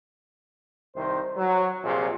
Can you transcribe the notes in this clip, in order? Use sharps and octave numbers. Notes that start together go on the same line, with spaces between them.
C2 D#3 C5
F#3
A#1 C3 F4 G#4